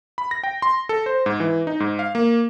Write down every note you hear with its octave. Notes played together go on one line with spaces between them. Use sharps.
B5
A#6
G5
C6
A4
C5
G#2
E3
D#4
G#2
F5
A#3